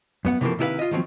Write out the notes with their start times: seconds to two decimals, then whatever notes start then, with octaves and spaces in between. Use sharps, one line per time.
0.25 F#2 B3 F#5
0.41 C3 E3 F3 A3 A#3
0.59 C3 D#3 E4 F4 B4 F5
0.79 F4 D#5
0.91 D#3 F3 F#3 B3 C4